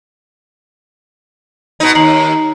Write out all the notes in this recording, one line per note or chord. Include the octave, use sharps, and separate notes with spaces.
B2 D#4
D#2 A#5 C7 F#7